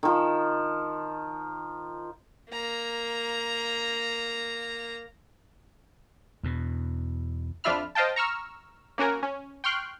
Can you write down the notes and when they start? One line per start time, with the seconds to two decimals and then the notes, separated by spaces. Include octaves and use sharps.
0.03 D#3 F3
2.51 A#3 A#5
6.43 E2 B2
7.64 F2 D4 F4 E5 B5 F6
7.95 C5 D#5 F5 G5 A5
8.16 A#5 C#6 E6 F6
8.98 A#3 C#4 F#4 A#4 G#5
9.23 C#4
9.64 G5 C6 C#6 F6 F#6